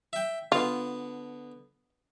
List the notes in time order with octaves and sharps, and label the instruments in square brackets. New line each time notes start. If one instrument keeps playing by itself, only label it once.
[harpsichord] E5 G5
[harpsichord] D3 B3 [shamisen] F4